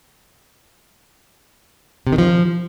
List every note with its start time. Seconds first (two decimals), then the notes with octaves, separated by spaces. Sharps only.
2.07 C3
2.12 D#3
2.18 F3